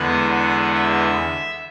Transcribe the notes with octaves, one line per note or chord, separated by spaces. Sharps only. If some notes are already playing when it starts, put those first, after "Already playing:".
Already playing: E2 D3 G#3 B3 F#5
F#5
E5